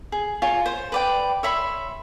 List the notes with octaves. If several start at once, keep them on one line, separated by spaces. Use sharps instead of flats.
G#4
F4 C#5 G#5
C5
B4 D5 G5
C#5 E5 B5 C6